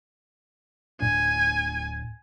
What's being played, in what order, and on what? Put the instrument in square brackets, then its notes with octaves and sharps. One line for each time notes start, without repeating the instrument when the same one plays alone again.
[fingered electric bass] D1 A2 D4 [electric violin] G#5